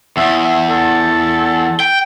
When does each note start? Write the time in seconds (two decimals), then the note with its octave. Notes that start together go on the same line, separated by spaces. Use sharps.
0.17 E2 E5
0.44 E5
0.70 A4
1.80 G5